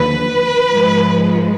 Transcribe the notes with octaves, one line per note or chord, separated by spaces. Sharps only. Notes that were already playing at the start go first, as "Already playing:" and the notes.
Already playing: D#2 D3 F3 B4
G#2 F3 G#3